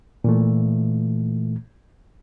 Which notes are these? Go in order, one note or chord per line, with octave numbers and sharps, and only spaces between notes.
A#2 E3 A3